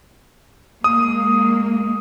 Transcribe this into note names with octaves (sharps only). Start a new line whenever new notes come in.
G#3 A#3 D#6